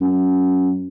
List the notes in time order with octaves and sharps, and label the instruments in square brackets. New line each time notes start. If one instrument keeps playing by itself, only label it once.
[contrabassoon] F#2